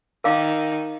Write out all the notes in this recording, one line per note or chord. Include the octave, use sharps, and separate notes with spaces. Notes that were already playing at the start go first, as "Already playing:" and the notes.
D#3 A#4 F5 D6